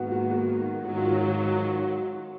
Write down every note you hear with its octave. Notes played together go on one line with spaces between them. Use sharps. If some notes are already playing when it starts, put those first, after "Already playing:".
Already playing: G#2 D#3 A#3 B3 F#4
F#4
F#4
G#2 D#3 F#3 F#4
F4
F#4